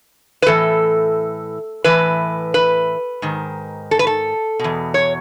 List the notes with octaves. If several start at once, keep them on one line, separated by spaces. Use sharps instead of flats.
B4
A2 E3 A4
A2 E3 B4
B4
G#2 D#3
A4
B4
A4
E2 B2
C#5